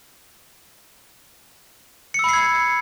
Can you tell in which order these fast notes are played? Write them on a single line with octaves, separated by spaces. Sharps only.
C#7 E6 B5 C7 G#6